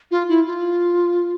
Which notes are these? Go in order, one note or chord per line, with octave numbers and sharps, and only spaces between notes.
F4
E4
F4